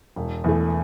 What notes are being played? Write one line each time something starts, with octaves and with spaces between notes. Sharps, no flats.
E1
E2 E3 A3